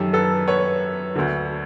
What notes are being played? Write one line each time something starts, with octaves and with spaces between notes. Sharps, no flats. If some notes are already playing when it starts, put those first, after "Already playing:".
Already playing: F#2 D#3 G4 A4
A4 B4
B4 C#5
D2 D3